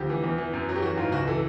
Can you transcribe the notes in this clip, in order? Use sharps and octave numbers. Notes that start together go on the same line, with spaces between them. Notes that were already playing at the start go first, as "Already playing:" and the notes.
Already playing: D2 F3 G4
E3
E2
E3
F#2
F#3
G4
E3 F#4
G#2 F4
C#2 F#4
E3 A4